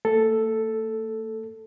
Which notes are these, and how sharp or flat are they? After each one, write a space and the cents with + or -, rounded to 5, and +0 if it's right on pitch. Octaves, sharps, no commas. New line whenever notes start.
A3 +45 A4 +0